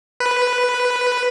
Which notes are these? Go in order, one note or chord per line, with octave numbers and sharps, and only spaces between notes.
B4